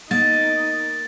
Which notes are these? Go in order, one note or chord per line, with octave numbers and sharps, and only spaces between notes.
A#3 D#4 D#5 A6